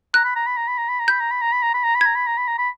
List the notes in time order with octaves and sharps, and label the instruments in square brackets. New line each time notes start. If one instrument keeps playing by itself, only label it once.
[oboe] A#5 [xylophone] F#6
[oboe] B5
A#5
B5
A#5
B5
A#5
B5
A#5
[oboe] B5 [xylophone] G6
[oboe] A#5
B5
A#5
B5
A#5
B5
A#5
B5
[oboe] A#5 [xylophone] G#6
[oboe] B5
A#5
B5
A#5
B5